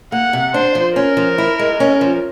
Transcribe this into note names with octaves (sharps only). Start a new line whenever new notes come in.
A#3 F#5
C3
D4 C5
F3
C#4 A#4
F3
E4
G#3
C#4
F3